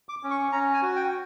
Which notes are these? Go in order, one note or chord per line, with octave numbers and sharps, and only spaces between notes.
D6
C#4
C#6
C#4 A#5
G#5
F#4
G5